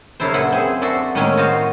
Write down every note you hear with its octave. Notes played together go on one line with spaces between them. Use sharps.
F#2 C#3 E4 A4 C5
F#2 A#2 B4 E5 F#5 C6
C4 G#4
F#4 A4 C5 D5 E5
A2 D#3 G#3 A#3 C#4 D#4
F4 F#4 C5 D#5 F5